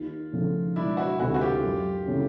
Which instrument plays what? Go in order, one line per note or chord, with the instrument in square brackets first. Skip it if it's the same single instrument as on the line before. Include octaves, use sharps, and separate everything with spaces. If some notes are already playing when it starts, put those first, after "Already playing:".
Already playing: [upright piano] D#2 [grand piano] F4
[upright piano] C#3 F3 A3
[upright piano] E1 [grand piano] D4 E4
[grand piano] E4 F#4
[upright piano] D2 C3 [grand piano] E4 F#4
[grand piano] F#4
F4 G4
[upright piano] F#2
C#3 E3 A3 C#4